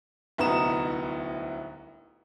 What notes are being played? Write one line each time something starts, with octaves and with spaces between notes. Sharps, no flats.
D1 C2 B3 D#4 A#5 E7